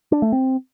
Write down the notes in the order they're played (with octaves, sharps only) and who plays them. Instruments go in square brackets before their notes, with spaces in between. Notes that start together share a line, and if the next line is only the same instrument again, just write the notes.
[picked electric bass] D4
A3
C4